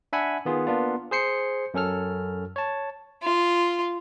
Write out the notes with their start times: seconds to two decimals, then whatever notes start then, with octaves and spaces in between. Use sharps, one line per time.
0.13 D4 E5 F#5 G#5 B5
0.45 D#3 B3 F4 G#4
0.67 A#3 B3 D4 F4
1.11 G#4 C5 C7 C#7
1.74 F#2 C#4 A4 F6
2.56 C#5 A5
3.23 F4